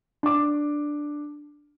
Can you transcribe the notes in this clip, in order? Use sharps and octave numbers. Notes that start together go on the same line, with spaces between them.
D4 D6